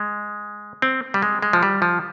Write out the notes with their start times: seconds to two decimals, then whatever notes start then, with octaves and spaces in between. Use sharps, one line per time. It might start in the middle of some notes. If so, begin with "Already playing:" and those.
Already playing: G#3
0.82 C4
1.14 G3
1.22 G#3
1.42 G#3
1.53 F3
1.63 G3
1.82 F3